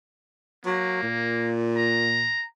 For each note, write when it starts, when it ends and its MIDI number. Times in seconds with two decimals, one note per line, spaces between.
0.66 0.98 54
0.66 1.53 58
1.03 2.34 46
1.76 2.45 82